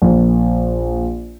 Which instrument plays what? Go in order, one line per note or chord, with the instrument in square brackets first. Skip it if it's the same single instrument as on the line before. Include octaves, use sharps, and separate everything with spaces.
[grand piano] A#1